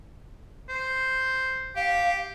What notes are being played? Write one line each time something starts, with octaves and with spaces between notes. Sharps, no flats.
C5
G4 F5